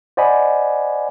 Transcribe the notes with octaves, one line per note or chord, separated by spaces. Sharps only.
C5 D5 D#5 F#5 G#5 B5